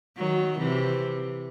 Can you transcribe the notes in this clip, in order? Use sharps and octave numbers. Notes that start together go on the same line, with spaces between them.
D#3 F#3
C3 E3